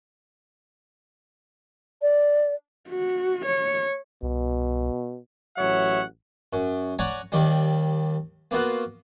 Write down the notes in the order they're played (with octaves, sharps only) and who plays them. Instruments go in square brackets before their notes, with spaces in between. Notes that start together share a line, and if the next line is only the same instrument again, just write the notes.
[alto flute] D5
[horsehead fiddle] F#4
C#5
[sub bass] C2 [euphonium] B2
[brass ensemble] A1 F#3 C#5 E5 F#5
[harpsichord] F#2
C#5 D5 F#5 G#5 A#5 C#6
D#2 D#3 G3
A#3 B3 F4 F#4